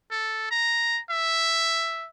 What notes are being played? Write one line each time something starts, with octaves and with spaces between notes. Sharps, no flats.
A4
A#5
E5